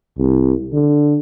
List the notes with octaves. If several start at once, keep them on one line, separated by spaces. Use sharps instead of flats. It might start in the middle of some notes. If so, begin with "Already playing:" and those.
C2
D3